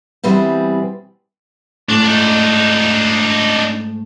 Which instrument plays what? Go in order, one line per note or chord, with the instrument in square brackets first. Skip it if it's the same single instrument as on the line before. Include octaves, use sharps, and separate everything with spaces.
[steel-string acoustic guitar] B2 E3 G3 C4 G#4
[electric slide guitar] G#2 A3 [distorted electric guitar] D4
[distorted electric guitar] D4 D#4